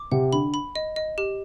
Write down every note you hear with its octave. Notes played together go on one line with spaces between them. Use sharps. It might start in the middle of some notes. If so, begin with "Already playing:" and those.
Already playing: D6
C3 F#5
D3 B5
B5
D#5
D#5
G4